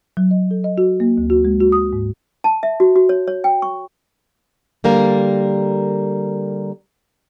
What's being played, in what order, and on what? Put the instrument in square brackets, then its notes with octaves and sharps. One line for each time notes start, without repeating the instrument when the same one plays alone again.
[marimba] F#3
D#5
A4
D#5
F#4
A#3
D2
F#4
G#3
F#4
D#6
G#2
[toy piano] A5
E5
F#4
F#4
C#5
C#5
G5
C#6
[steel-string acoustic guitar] D3 G3 A#3 A#4